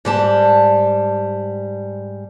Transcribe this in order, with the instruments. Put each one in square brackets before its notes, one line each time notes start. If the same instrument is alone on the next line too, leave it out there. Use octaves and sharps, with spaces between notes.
[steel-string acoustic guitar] G#2 G3 A5